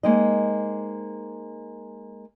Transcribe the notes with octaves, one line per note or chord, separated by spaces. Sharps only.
G#3 A#3 C4 D#4 D#5